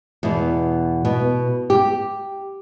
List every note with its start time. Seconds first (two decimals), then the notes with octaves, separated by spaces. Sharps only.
0.23 E2 B2
1.05 B2
1.70 G4